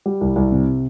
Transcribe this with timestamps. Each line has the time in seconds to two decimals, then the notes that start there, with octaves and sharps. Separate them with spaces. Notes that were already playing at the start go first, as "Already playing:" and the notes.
0.06 G3
0.21 C2
0.36 C2
0.52 C3